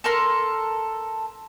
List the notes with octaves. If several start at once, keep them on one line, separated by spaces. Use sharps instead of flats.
A4 A#4 C6